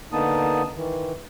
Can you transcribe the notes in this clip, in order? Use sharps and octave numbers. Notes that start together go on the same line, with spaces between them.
D3 A#3 B3 D#4 A5 D#6
D#3 E3